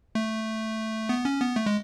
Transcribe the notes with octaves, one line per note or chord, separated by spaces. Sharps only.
A3
B3
C#4
B3
A3
G#3